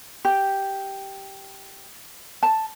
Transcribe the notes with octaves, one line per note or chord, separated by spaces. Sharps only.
G4
A5